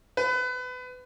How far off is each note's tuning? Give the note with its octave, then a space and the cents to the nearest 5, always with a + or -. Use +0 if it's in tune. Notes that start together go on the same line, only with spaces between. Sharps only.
B4 +25